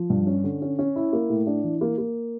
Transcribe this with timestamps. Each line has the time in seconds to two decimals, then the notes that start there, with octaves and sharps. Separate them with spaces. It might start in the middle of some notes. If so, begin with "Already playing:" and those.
Already playing: F3
0.10 G2
0.27 C#4
0.44 D3
0.62 C#4
0.79 C#4
0.96 E4
1.13 A#3
1.30 A2
1.47 D4
1.64 E3
1.81 A#3
1.98 A#3